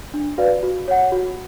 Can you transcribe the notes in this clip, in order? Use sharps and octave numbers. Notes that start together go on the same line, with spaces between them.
D4
F#4 B4 D5 F5
F#4
C#5 F#5
F#4